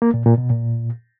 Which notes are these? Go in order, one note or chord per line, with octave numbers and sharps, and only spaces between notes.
A#3
A#2
A#2
B2
A#2